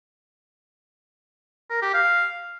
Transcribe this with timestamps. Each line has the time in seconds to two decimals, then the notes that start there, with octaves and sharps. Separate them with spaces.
1.71 A#4
1.82 G4
1.94 F5